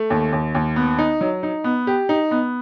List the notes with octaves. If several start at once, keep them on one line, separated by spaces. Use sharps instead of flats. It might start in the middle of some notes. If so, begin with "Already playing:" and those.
Already playing: A3
D#2
D#2
D#2
B3
D#4
F#3
D#4
B3
G4
D#4
B3